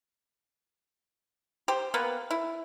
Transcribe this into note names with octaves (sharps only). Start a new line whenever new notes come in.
G4 C5
A#3 B3 B4
E4